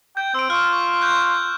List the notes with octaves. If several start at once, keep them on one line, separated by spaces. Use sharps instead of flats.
G5 G6
C4 E6 D7
F4 C#6 F6
C#6
F#6 G6